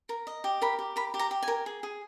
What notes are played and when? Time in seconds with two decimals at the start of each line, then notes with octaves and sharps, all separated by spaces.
0.09 A#4
0.27 D#5
0.44 G4
0.62 A#4 B5
0.79 G4
0.96 A#4 B5
1.14 G4
1.19 A#5
1.31 G4
1.43 G#5
1.48 A#4
1.66 G#4
1.83 G#4